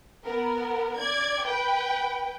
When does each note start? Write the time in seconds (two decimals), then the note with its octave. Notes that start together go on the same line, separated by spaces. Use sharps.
0.25 B3 A#4
0.98 D5 G#6
1.45 B4 G5